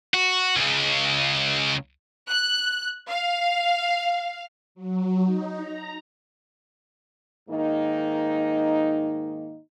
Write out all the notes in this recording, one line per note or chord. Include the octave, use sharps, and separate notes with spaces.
F#4
C#2 C#3
F#6
F5
F#3
D#4
A#5
G#2 D#3 A#3 D#4